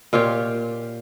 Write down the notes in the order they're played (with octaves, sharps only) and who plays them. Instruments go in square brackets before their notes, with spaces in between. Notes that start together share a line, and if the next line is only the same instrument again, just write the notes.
[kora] A#2 F4 G4 C#5